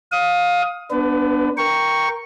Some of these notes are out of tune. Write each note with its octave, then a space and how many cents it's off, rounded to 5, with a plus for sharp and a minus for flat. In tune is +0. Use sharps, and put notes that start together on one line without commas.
F5 +20 D#6 +15
B3 -5 D4 +0 B4 +35
A#4 +0 G5 +0 C#6 +0